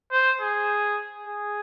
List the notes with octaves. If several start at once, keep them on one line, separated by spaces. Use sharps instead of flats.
C5
G#4
G#4